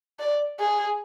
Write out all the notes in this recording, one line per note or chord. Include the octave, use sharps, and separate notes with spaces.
D5
G#4